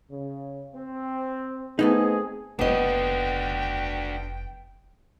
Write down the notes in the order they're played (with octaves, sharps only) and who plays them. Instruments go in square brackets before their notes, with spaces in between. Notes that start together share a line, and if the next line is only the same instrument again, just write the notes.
[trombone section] C#3
C4
[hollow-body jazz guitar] A3 B3 D#4 [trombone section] C4 G#4
[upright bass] F1 D#2 [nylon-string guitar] B3 D#5 [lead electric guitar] D4 F#4 [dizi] G5